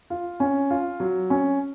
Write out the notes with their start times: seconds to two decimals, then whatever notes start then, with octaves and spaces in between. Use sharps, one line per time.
0.10 F4
0.40 C#4
0.70 F4
1.00 F#3
1.30 C#4